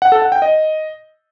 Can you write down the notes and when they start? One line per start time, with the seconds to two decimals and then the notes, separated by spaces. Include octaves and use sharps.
0.02 F#5
0.12 A4
0.22 F#5
0.32 G5
0.42 D#5